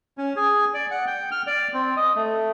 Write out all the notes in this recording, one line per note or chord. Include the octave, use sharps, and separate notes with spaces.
C#4
G#4
D5
F#5
G5
F6
D5
C4
D#5
A3